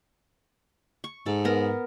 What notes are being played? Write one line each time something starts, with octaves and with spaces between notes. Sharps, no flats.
C#6
G#2 A4
B3 A#4